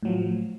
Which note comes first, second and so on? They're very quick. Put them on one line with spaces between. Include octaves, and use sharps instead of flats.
A2 F#3 F3